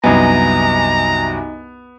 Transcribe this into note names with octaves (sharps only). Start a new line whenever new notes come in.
C2 F#2 B3 D#4 D#5 G#5 A#5